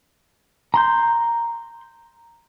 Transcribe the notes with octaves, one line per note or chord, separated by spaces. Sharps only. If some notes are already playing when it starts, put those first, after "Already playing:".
A#5 C6 G6